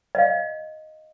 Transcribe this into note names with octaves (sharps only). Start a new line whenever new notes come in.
D#5 F5